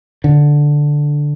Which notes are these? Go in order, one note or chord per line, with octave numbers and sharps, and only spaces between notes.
D3